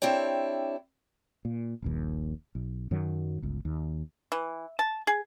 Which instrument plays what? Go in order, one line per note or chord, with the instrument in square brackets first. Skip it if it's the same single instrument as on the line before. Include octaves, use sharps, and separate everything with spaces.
[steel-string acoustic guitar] C4 D4 E4 G4 C#5
[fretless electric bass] A#2
D#1 A#1 D#2
B1
F#2 D#3 F#3
G1 C#2
D#2
[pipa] E3
A5
G#4